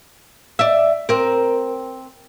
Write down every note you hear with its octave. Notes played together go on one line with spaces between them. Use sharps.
D5 E5
C4 A#4